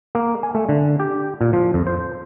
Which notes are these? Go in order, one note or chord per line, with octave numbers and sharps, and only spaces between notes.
A#3
G#5
A3
D3
G4
A#2
F3
F2
C5